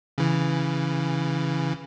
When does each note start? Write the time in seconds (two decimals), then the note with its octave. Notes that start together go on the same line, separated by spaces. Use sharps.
0.18 C#3 E3